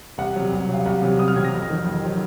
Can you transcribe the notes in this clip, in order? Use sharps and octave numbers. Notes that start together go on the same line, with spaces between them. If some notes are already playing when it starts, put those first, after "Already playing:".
C2 F#5
C3 F#3
C2
C3 F#3
F5
C2 F#5
C3 F#3
C2 D#6
F6
C3 F#3 G#6
A#6
F2
D#3 F#3
F2
D#3 F#3